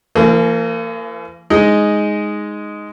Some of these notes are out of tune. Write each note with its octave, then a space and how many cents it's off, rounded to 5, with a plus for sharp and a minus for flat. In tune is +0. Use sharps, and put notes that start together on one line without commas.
E3 +45 A#3 -30 G#4 +40
G#3 +0 D#4 +0